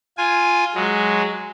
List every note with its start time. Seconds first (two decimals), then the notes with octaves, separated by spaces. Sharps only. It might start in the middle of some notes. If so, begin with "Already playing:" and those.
0.18 F4 G#5
0.75 F#3 G#3